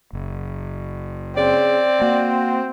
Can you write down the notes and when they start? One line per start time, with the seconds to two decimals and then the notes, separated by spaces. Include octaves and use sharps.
0.13 F#1
1.37 C#3 C4 D5
2.01 A#3 F#4